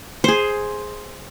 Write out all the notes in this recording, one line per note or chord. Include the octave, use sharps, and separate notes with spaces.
G#4 C5